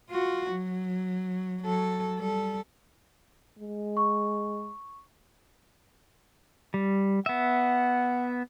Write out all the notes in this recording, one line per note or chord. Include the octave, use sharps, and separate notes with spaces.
F4 F#4
F#3
F#3 A4
G3 A4
G#3
C#6
G3
B3 E5 F#5